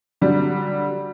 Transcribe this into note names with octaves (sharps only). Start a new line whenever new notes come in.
D3 F#3 G3